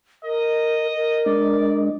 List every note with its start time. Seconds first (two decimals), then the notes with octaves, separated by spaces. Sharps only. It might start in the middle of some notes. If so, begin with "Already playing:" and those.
0.24 A#4 D#5
0.96 A#4
1.26 G#3 D4 D5 D#5